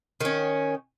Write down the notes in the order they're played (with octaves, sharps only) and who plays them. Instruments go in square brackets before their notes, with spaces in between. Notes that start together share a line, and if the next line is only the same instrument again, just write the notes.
[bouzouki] D#3 C#4